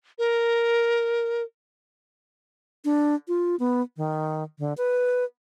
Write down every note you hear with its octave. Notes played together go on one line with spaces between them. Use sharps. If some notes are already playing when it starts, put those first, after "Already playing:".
A#4
D4
F4
B3
D#3
D3
B4